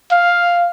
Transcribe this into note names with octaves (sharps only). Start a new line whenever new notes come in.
F5